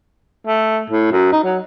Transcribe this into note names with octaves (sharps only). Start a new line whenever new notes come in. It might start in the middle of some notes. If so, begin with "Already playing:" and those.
A3
A2
F#2
D#4
F#3